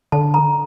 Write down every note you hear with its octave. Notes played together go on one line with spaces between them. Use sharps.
D3 A5
A#5